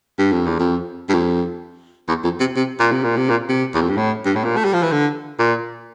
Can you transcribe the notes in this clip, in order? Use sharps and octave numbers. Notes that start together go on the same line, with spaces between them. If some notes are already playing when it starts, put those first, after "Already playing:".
G2
F2
E2
F2
G2
F2
E2
F2
C3
C3
A#2
C3
A#2
C3
A#2
C3
E2
F2
G2
A2
G2
A2
A#2
A3
G3
F3
E3
D3
A#2